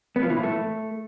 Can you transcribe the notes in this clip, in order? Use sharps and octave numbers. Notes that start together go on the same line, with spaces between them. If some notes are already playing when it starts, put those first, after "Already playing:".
B3
F3
E3
A2
A3